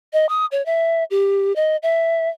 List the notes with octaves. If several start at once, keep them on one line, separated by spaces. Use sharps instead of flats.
D#5
D#6
C#5
E5
G4
D#5
E5